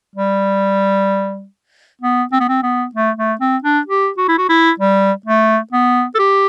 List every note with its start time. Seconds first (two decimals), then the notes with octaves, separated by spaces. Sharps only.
0.16 G3
2.01 B3
2.32 C4
2.40 B3
2.49 C4
2.63 B3
2.95 A3
3.17 A3
3.41 C4
3.64 D4
3.87 G4
4.18 F#4
4.28 E4
4.38 F#4
4.49 E4
4.80 G3
5.26 A3
5.72 B3
6.15 A4
6.19 G4